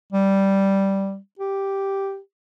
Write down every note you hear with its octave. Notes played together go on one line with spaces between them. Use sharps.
G3
G4